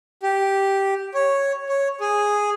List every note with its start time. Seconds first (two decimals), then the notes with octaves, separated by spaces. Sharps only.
0.23 G4
1.14 C#5
1.69 C#5
2.00 G#4